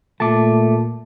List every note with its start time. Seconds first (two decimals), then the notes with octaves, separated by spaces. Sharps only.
0.20 A#2 A3 A5 D6